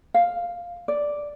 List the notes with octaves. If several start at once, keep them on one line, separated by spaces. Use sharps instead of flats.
F5
D5